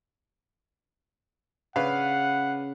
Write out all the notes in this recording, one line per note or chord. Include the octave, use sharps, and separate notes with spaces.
C#3 D4 B4 F5 F#5